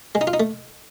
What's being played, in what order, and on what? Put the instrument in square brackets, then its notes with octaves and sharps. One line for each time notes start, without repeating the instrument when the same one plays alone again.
[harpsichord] G#3
D#4
F4
D#4
A3